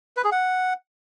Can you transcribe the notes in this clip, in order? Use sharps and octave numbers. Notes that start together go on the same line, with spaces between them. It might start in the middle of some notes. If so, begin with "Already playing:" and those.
B4
G#4
F#5